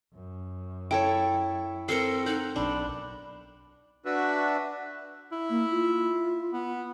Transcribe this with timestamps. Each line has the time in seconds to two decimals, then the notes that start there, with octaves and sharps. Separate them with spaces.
0.14 F#2
0.91 E4 A4 C#5 G5
1.89 C4 A4 A#4 C7 C#7
2.26 D#4 F#5 G6
2.56 B1 D4 B5
4.05 D4 F#4 B4 E5
5.32 E4
5.50 A#3
5.71 F4
6.53 B3